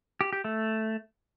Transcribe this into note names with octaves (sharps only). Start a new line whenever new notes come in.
G4
G4
A3